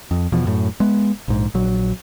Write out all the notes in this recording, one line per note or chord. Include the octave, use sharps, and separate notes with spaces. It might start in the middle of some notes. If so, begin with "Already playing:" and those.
F2
E2 B2 F3
F#2 A2
G#3 B3
A#1 G#2
A#1 F#3